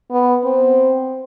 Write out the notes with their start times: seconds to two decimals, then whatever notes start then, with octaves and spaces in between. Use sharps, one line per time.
0.11 B3
0.44 C4